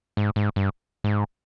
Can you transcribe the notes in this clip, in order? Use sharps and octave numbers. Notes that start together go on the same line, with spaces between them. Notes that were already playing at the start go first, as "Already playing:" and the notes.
G#2
G#2
G2
G#2